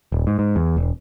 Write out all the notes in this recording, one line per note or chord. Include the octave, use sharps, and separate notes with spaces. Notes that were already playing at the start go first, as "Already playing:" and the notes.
D#1
G#2
G#2
E2
E1